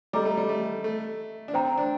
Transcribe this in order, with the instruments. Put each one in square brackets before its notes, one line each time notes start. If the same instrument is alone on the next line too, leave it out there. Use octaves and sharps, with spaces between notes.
[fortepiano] G3 [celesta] A4 D#5 A#5 D6
[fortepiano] A3
G3
A3
A3
D4
[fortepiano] C4 [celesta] C5 G5 A#5
[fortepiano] C4
D4